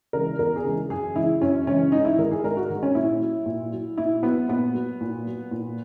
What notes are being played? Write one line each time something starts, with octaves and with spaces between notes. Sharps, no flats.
C#3 E3 G#3 A#4
E2 A#4
G#4
C#3 E3 G#3
F#2 G#4
C#3 E3 G#3 E4
F#2 C#4
C#3 E3 G#3 C#4
G#2 D#4
E4
D#3 G#3 A#4
G#4
G#2 A#4
F#4
D#3 G#3
C#4
A#2 E4
F#3
A#2
F#3
A#2 E4
F#3 B3
A#2 B3
F#3
A#2
F#3
A#2